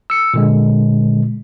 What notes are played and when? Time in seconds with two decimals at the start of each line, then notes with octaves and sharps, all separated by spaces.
0.10 E6 C#7
0.34 A#2 D3 G#3